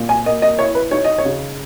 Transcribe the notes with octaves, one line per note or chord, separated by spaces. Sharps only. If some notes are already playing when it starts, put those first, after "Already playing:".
Already playing: A#2
G#5
A#3 D#5
D#5
E4 C#5
B4
D#4 C#5
D#5
C#5
C#3